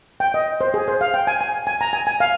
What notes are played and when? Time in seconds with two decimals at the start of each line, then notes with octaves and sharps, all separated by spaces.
0.20 G5
0.34 D#5
0.61 C5
0.74 G#4
0.88 C5
1.01 F5
1.14 G5
1.27 G#5
1.41 G#5
1.67 G#5
1.81 A#5
1.93 G#5
2.07 G#5
2.20 F5